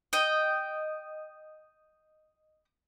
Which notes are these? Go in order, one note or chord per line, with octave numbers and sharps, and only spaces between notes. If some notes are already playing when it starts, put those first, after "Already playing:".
D#5 G5